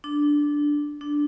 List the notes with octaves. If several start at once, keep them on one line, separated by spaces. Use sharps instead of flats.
D4
D4